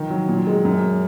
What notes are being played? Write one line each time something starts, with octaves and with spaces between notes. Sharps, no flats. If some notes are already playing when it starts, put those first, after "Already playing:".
Already playing: D#3 F3
F#3
A#2
G#3
F#2